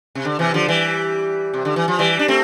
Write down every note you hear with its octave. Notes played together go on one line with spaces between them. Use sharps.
C3
D3
C3 E3
D3 F3
E3 G3
C3
D3
E3
F3
E3 G3
D4
A3 C4